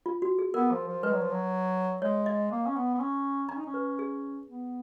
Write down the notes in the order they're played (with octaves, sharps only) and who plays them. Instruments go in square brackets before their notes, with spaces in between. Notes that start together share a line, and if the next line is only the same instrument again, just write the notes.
[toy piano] F4
F#4
G#4
[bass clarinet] B3 [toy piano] A#4
[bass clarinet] F3
F3
[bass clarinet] G#3 [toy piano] B4
[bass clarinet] F#3
F3
F#3
[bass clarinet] G#3 [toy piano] C#5
[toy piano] D#5
[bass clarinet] A#3
C#4
B3
B3
C#4
[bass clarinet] C#4 [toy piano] A#5
[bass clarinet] D#4
C#4
[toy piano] B4
G#4
[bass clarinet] B3